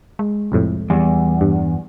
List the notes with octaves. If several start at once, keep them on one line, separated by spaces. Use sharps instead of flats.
G#3
C2 F2 A2
E2 G3
G2